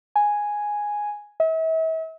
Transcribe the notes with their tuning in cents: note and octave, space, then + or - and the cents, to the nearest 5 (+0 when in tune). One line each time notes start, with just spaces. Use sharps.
G#5 +0
E5 -40